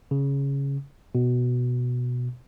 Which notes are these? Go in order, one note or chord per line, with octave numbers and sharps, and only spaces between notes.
C#3
B2